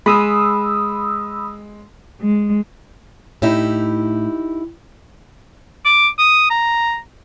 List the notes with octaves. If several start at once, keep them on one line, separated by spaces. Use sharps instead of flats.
G#3 B5 D#6 E6
G#3
A2 D#4 E4 G4
D6
D#6
A#5